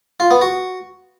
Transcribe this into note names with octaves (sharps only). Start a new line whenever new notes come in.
F4
B3
F#4